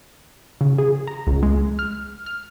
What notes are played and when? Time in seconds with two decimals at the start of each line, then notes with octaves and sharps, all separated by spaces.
0.61 C#3
0.78 G#4
1.07 A#5
1.27 C#2
1.43 G#3
1.79 F6
2.26 F6